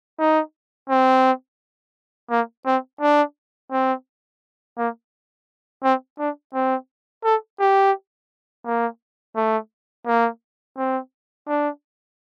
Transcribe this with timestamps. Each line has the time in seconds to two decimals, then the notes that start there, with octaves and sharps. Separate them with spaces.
0.19 D#4
0.89 C4
2.30 A#3
2.66 C4
3.01 D4
3.72 C4
4.78 A#3
5.83 C4
6.19 D4
6.54 C4
7.25 A4
7.60 G4
8.65 A#3
9.36 A3
10.07 A#3
10.77 C4
11.48 D4